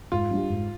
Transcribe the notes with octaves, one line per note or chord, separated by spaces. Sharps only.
G#2 F4
G3 D4 G4
G#2